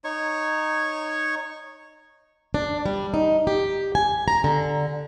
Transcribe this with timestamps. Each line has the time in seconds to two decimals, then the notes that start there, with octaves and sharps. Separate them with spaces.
0.04 D#4 C#5 C#6
2.54 D4
2.86 G3
3.14 D#4
3.47 G4
3.95 G#5
4.28 A#5
4.44 D3